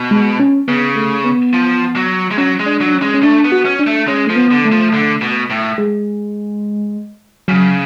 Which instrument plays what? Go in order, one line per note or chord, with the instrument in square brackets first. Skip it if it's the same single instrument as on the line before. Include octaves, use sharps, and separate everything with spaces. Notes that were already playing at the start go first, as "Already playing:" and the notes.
Already playing: [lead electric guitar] B2
[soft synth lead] G#3
C#4
[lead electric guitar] C#3 [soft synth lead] B3
[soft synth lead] A3
B3
[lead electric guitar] F3
F#3
G#3
[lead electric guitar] F#3 [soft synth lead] C#4
[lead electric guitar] G#3
[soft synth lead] D4
[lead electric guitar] F#3
[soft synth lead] D4
C#4
[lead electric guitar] G#3
[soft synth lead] C#4
[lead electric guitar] A3 [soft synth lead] D4
[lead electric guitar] B3
[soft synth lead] F#4
[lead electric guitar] C#4
[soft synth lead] D4
[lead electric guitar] A3
[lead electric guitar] G#3 [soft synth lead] C#4
[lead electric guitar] F3 [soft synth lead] A3
[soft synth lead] B3
[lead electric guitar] D3
[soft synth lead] A3
[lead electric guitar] F3
D3
B2
A2
[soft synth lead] G#3
[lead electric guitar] C#3 [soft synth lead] F#3